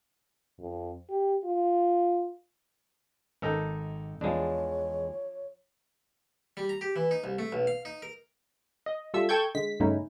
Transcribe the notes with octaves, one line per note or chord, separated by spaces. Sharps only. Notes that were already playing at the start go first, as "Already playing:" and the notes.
F2
G4
F4
G#1 D#4 A4 A#4
E2 F3 G#3 D4 C#5
G3
A#5
G4
E3
D#4
C2
A3
B1
F5
D#4
A#4
D#5
G3 F4 A4 E5 E6
A4 G5 A5 C#6 G6 G#6
D3 G#3 B6
G2 C#3 A3 C#4 D#4 E4